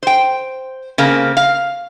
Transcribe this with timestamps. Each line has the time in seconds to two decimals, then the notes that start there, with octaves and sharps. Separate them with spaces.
0.03 C5 G5
0.98 C#3 A#3 C4
1.37 F5